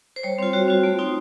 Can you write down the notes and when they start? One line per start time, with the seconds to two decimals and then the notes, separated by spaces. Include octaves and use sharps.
0.16 C5
0.23 G3 C#5
0.38 C4 F4 C5
0.53 G3 F#4
0.68 C4 F4
0.83 A3
0.99 C4 D#4